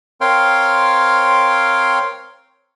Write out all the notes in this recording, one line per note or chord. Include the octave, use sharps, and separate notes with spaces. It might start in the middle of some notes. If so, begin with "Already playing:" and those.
C4 A#4 C#5 F5 G5 C6